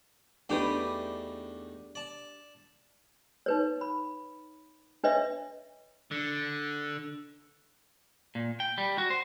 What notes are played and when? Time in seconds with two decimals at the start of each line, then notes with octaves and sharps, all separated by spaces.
0.49 E2 A3 D4 D#4 G4 B4
1.95 D5 A5
3.46 D#4 B4 C#5
3.81 B5
5.04 D4 B4 C#5 D#5 E5
6.12 D3
8.35 A#2
8.60 G5
8.78 G3
8.98 F#4
9.10 C5